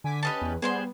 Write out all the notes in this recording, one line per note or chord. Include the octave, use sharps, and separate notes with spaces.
D3 G#5 D6 B6
C#4 G4 B4 D#5 A5
E2
G3 B3 G#4 C5 C6